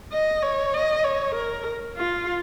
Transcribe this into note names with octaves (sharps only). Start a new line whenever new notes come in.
D#5
C#5
D#5
C#5
A#4
F4